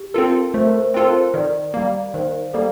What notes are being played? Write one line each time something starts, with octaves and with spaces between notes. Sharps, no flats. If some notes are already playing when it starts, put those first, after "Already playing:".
Already playing: G4
C4 F4 A4 A#4
A3 C5
A#4
C5
C4 F4 A4 C5
A#4
C5
D#3 D5
G3 A#3 F5
D#3 C5
G3 A#3 A4